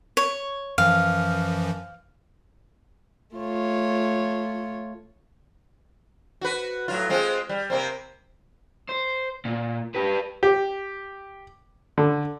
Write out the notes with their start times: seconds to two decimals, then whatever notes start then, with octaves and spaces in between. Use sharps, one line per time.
0.17 C#5
0.78 F#2 E3 F3 F5
3.35 A3 F4 C#5
6.41 F#4 B4
6.88 A2 F#3 F4
7.10 G#3 C4 F4
7.49 G3
7.70 C3 A#3 C4
8.89 C5
9.45 A#2
9.95 G4 B4
10.43 G4
11.98 D3